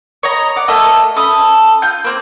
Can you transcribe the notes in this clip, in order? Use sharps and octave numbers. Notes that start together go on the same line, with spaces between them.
C#5 D#5 A#5
D5 F#5
A3 A#3 A4 D#5
C#4 A4 B5 D#6
F4 G6
A#3 C4